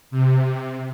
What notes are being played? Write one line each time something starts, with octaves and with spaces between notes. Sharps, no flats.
C3